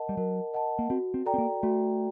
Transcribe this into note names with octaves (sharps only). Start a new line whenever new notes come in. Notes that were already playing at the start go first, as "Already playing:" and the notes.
Already playing: A#4 D#5 F#5 A5
G3
F#3 A#4
D#5 F#5 A5
A#3
C4 F#4
C4
A4 D5 G5 A#5
C4
A#3
A3 F#4